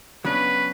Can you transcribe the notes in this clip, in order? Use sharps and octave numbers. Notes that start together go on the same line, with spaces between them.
C#3 F#3 B3 D4 B4